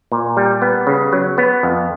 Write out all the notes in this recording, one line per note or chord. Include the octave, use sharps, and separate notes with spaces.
A#2
G3
B3
C#3
F#3
B3
F2